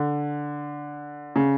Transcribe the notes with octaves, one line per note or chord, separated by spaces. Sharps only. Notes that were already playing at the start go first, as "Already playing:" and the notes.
Already playing: D3
C#3